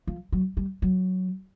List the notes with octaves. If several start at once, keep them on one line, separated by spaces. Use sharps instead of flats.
F3
F#3
G3
F#3